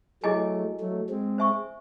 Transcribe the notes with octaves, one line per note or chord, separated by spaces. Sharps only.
F#3 A3 E4 G#4 D#5 G#5
F#3 A3
G#3 C4
C5 E5 G#5 C#6